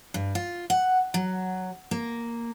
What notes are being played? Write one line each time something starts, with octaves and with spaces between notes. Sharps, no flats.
G2
F4
F#5
F#3
A#3